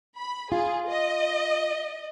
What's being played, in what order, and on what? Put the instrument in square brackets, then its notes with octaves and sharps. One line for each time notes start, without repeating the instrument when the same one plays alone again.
[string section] B5
[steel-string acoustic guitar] F4 [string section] G#4
[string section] D#5